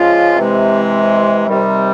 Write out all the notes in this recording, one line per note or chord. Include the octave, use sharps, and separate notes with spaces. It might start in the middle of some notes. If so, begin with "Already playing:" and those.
Already playing: F3 G#3 C#4 F4
C3 E3 G#3
C3 D#3 G3